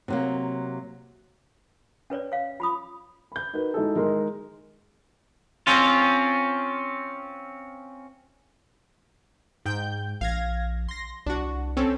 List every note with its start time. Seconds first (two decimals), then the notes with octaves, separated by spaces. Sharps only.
0.08 C3 F#3 A#3
2.10 C#4 B4 C#5 D5
2.32 C#5 F5
2.60 F4 B5 D#6
3.32 B5 G6
3.54 D#4 F#4 A#4 B4
3.74 G#3 D#4 E4 F#4 G#4 A4
3.95 D#3 G#3 A#4 D#5 C6
5.67 C4 C#4 F4
9.66 G#2 G5 G6
10.21 A#1 F5 G#6 A#6
10.88 C6 A#6
11.26 C2 D4 F#4
11.77 C4 C#4 A4